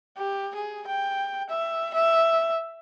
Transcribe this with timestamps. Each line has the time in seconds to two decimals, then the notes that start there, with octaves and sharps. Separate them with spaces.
0.17 G4
0.55 G#4
0.87 G5
1.50 E5
1.94 E5